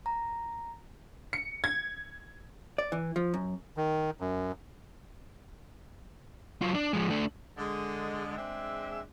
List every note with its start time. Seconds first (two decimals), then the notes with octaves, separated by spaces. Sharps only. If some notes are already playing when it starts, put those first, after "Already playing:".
0.06 A#5
1.33 C#7
1.64 G#6
2.78 D5
2.92 E3
3.16 F3
3.34 F#2
3.77 D#3
4.20 F#2
6.62 F#3 F4
6.74 D4
6.93 F3 G#3
7.10 A3 D4
7.57 D3 G#3
8.37 G#3 C4 D4 G#4 E5